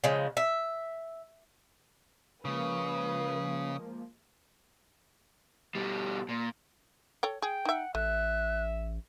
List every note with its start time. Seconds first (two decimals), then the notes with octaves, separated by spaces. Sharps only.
0.04 C#3 F3 G#3
0.37 E5
2.45 C#3 F3 G#3 A#3 B4 D#6
5.75 B2 G3
6.29 A#2
7.23 A4 C#5 G5
7.42 G#4 G5
7.65 D#4 E5 F#5
7.95 A1 A3 E5 F#6